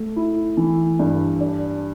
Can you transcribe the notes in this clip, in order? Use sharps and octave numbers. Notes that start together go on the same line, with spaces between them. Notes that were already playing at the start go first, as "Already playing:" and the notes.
Already playing: A3
E4
E3
G2
D4